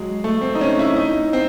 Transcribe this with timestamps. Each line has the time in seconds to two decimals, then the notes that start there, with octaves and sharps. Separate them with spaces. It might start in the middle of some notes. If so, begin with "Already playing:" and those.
Already playing: F#3 G#3
0.24 A3
0.42 C4
0.55 D#4
0.61 C#4
0.79 E4
0.97 D#4
1.33 C4